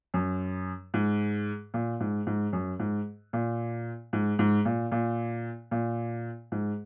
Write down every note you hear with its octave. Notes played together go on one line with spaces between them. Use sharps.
F#2
G#2
A#2
G#2
G#2
F#2
G#2
A#2
G#2
G#2
A#2
A#2
A#2
G#2